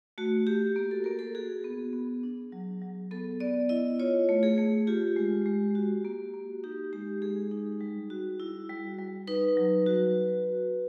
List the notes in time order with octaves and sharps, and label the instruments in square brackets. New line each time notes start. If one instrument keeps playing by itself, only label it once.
[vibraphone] A3 F#4
F#4 G4
A#3
A4
A#3 A#4
A4
F#4 G#4
B3
B3
D4
F#3
F#3
B3 A4
B3 D5
E4 D#5
F4 C#5
A3
G#4
A3
F4 G4
G#3
G#3
F#4
A#3
A#3
D#4 G4
G#3 G4
G#3 G#4
D#4
G3
F#4
E4
G3
G3
D#4 B4
F#3
F#4